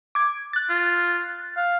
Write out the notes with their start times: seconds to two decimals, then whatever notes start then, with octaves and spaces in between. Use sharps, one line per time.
0.15 D6 G#6
0.53 F#6 A6
0.70 F4
1.57 F5